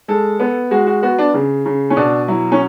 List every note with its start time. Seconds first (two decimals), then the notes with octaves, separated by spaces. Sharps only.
0.08 G#3 A4
0.40 B3
0.71 G#3 F#4
0.87 F#4
1.03 B3 F#4
1.18 D4
1.34 C#3
1.65 C#3
1.90 C#4
1.96 B2 D4
2.28 F#3 E4
2.52 C#4